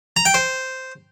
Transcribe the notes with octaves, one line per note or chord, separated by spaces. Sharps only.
A#5
G5
C5